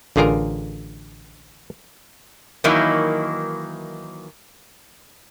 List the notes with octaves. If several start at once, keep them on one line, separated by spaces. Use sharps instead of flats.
A1 D3 F4 G#4 A#4 A#5
D#3 E3 F#3 A#3 D#4 E4